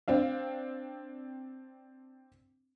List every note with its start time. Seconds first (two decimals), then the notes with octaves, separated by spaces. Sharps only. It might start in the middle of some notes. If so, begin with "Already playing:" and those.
0.08 C4 D4 F5